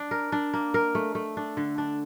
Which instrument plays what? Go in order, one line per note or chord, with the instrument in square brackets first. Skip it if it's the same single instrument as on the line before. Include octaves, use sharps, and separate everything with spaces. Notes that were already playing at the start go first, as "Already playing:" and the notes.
Already playing: [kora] D4
A#4
D4
A#3
A#4
A3
A3
D4
D3
D4